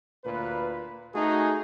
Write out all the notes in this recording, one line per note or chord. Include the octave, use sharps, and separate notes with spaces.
D2 A#2 B4
A3 D#4 F#4 G#4